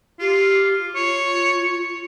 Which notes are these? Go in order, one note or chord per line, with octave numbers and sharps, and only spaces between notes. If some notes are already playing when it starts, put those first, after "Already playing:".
F4 G4
F4 C#5